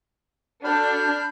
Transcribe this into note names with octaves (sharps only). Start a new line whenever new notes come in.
D4 F#4 A4 B5 F6 G6